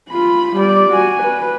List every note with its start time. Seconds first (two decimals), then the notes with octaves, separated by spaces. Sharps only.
0.10 F4 B5
0.56 G3 D5
0.91 F#4 G#5
1.23 B4